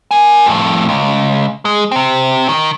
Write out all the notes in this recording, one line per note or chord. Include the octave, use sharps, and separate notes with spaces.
A#4 G#5
F2 A2
C#2
G#3
C3 C4
D#3